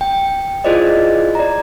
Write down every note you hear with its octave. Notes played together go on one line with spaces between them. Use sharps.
G5
E4 F4 G#4 C5 D5 D#5
D5 A#5